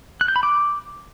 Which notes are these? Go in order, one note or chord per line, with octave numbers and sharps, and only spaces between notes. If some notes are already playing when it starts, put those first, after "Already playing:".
F#6
G6
B5
D6